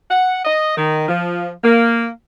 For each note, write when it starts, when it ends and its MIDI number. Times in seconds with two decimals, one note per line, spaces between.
0.11 0.39 78
0.45 0.73 75
0.77 1.08 51
1.08 1.51 53
1.64 2.09 58